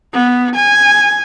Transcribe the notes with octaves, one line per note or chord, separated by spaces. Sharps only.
B3
G#5